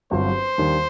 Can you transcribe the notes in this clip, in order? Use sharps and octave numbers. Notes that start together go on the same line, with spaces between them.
G1 G2 F#3 C4 F#4 C5
D#2 D#3 G3 D4